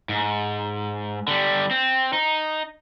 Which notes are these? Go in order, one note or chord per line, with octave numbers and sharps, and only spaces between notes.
G#2
D3 G3
C4
D#4